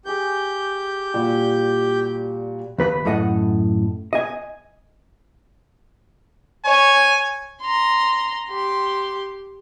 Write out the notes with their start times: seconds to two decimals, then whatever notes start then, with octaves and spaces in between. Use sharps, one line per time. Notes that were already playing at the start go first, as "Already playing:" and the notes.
0.05 G4 G#4 C#6 G6
1.14 A#2 G3 F#4 E6
2.78 D#2 B4 B5
3.05 F#2 A2 A4 D#5 F#5
4.13 D#5 G#5
6.65 C#5 G#5
7.61 A#5 C6
8.49 G4 C6